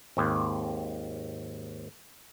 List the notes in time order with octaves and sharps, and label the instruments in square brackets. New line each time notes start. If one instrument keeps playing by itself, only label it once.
[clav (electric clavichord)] G#1 D#2